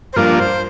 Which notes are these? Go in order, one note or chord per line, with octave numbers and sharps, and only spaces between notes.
C5
G2 F3 A#3 D4 F4 A#4
C5